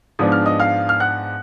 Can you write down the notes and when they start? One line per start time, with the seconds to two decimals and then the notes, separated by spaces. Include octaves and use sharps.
0.19 G#2 F3 B3 D4 D#6
0.32 F6
0.46 D#5 D#6
0.60 F5 F6
0.89 F6
1.00 F#5 F#6